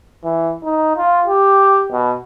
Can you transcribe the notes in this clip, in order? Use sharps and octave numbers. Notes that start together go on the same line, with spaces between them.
E3
D#4
F4
G4
B2